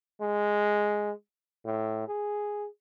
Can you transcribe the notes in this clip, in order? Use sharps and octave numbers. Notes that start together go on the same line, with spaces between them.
G#3
A2
G#4